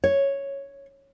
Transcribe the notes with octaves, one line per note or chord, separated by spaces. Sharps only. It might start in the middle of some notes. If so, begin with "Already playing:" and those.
C#5